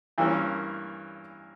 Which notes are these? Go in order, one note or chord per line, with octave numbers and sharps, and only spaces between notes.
G2 E3 A#3 C#4